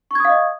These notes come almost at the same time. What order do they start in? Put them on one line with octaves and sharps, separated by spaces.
C#6 G#6 D#6 F5 D#5